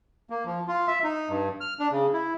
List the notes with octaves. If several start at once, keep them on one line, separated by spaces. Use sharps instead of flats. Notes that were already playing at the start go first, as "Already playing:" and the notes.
A#3
F3
F4
E5
D#4
G2
F6
D4
C#3
E4